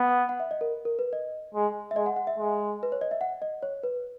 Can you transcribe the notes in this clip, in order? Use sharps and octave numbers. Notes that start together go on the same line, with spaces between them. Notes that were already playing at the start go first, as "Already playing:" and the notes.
Already playing: B3
F#5
F#5
E5
D#5
A#4
A#4
B4
D#5
G#3
E5
G#3 D#5
F#5
F#5
E5
G#3
B4
C#5
D#5
E5
F#5
D#5
C#5
B4